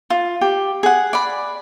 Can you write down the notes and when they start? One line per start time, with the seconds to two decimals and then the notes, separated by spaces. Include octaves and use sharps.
0.10 F4
0.41 G4
0.83 G#4 F#5
1.13 D5 B5